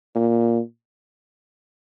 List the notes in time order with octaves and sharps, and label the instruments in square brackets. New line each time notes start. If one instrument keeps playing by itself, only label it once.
[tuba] A#2